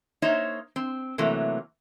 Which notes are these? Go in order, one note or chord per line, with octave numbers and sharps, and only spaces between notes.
A#3 D#4 C5 C#5 E5
C4
C3 E3 F#3 A3 A#3